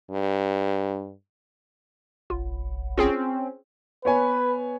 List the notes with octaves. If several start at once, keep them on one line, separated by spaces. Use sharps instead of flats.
G2
F#1 B1 F4
C4 C#4 F4 G#4 G5
B3 B4 C#5 G#5